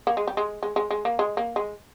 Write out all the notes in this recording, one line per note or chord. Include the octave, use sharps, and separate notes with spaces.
A#3
G#3
G3
G#3
G#3
G#3
G#3
A#3
G#3
A#3
G#3